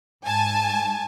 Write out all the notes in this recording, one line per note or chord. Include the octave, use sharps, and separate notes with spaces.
G#2 G#5 A5